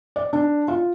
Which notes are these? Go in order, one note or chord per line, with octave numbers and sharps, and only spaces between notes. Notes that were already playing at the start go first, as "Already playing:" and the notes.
D5
D4
F4